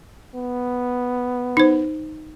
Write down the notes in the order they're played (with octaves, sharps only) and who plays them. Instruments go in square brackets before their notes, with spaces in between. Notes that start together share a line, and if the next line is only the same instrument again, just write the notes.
[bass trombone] B3
[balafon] D#4 C5